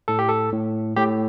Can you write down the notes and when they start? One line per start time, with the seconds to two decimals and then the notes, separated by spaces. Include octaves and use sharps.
0.08 A2 A4
0.19 G4
0.29 A4
0.52 A2
0.96 A2 G4